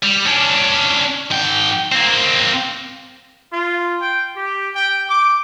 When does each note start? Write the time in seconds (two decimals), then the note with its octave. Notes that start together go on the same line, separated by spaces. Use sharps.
0.03 G3
0.26 C#4 D4
1.30 G#2 G5
1.92 A#3 C4
3.52 F4
4.01 G5
4.36 G4
4.75 G5
5.09 D6